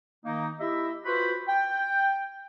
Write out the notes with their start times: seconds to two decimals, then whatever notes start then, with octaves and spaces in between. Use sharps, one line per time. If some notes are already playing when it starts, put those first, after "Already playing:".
0.24 D#3 A#3 D#4
0.60 E4 G4 D#5 E5
1.06 F4 F#4 B4 C5 B5
1.48 G5